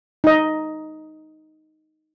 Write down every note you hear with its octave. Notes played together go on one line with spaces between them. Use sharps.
D#4 D#5